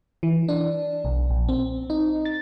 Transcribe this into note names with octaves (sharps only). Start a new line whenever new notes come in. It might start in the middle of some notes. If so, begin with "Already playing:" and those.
E3
D4
B1
A#1
C4
D#4
A6